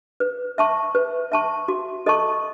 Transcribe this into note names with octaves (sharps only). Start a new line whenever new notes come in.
B4
E5 A5 C#6
B4
E5 A5 C#6
F#4
A4 D#5 A5 C#6